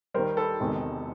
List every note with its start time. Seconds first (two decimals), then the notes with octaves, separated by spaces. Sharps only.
0.14 D#2 D#3 G3 A#4 C5
0.37 A4 B4
0.60 E1 E2 C3 D#3 G#3